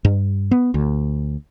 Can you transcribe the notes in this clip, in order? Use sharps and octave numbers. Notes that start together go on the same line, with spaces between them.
G2
B3
D2